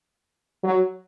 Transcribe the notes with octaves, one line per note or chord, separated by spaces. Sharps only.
F#3